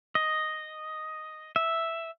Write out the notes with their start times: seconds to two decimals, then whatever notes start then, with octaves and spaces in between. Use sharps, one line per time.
0.15 D#5
1.56 E5